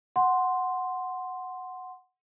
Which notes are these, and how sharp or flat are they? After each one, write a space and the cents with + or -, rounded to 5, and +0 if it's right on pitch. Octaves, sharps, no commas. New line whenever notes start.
F#5 +0 C6 +0